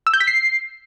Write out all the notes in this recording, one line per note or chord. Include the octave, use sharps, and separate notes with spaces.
E6
G6
B6
C7